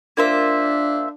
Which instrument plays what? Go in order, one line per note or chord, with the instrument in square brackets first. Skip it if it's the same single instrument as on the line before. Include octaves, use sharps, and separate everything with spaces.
[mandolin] A#3 F4 C5 E5 [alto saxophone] D4